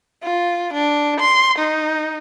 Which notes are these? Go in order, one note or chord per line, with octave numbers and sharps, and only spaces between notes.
F4
D4
C6
D#4